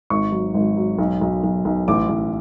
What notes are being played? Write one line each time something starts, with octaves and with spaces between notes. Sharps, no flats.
G#1 C#6
F#3
G#1
F#3
B1
B1
B1
B1
A1 D6
A1